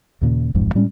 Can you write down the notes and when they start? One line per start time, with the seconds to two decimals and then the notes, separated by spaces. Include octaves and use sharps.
0.21 D#2 A#2 C#3
0.54 D#1 A1 F2 G#2
0.75 A2 G3 G#3 C#4